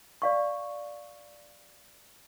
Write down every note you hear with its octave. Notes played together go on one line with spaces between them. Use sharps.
D5 F5 C#6